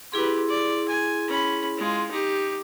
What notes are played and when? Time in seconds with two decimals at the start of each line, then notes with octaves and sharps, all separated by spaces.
0.12 E4 G4 G#4 B4 C6
0.48 D5
0.88 G#5
1.28 C#4 B5
1.77 G#3 F4
2.11 D#4 G4